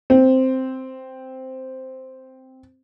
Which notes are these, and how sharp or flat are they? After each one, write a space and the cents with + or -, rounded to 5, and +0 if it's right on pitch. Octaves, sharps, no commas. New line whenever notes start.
C4 -5